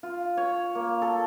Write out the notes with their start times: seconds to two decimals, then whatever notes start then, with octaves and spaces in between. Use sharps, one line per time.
0.03 F4
0.37 C#5
0.75 A#3
1.02 A4